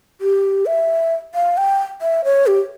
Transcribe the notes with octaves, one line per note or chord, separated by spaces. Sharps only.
G4
E5
F5
G5
E5
C#5
G4